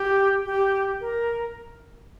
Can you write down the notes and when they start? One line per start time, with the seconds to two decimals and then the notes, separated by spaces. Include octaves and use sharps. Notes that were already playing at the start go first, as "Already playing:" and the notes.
Already playing: G4
0.45 G4
1.01 A#4